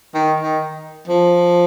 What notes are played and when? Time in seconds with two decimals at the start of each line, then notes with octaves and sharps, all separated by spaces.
0.14 D#3
0.40 D#3
1.08 F3